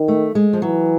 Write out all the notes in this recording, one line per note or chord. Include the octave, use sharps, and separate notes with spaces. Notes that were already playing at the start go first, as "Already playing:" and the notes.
Already playing: D#3
A3
G#3
F3
E3 F#3